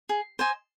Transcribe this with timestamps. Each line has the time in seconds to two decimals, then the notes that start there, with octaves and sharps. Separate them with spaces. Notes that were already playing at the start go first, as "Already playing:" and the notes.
0.09 G#4
0.39 C5 D#5 G#5